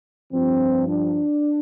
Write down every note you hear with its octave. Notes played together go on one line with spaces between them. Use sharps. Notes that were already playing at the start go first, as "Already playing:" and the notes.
G2 F3 C4
D4